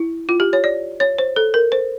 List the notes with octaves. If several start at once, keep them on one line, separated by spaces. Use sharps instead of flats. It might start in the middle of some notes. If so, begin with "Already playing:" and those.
Already playing: E4
F4
G4
C#5
D5
C#5
C5
A4
A#4
C5